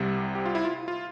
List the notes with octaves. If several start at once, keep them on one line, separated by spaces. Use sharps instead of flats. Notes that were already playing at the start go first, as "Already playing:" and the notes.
Already playing: C2 C3 G3
G4
F4
E4
F4
F4